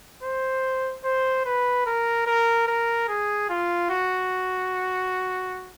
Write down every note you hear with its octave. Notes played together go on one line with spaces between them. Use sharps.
C5
C5
B4
A#4
A#4
A#4
G#4
F4
F#4